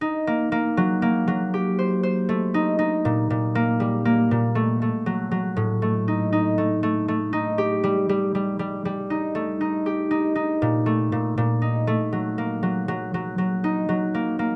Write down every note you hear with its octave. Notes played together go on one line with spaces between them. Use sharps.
D#4
A#3
A#3
F#3
A#3
F#3
G4
C5
C5
A3
D#4
D#4
A#2
A#2
A#3
G3
A#3
A#2
A3
A3
F#3
F#3
A2
A3
D#4
D#4
A3
A3
A3
D#4
G4
G3
G3
G3
G3
G3
D#4
A3
D#4
G4
D#4
D#4
A#2
A3
A#2
A#2
D#4
A3
F#3
A#3
F#3
F#3
F#3
F#3
D#4
F#3
A#3
A#3